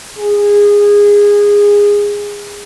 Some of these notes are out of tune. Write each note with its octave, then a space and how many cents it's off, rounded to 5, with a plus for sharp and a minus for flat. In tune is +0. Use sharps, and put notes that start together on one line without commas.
G#4 -20